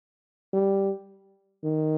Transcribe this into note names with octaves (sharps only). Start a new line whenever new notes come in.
G3
D#3